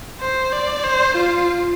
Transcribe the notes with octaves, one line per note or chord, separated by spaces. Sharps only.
C5
D5
C5
F4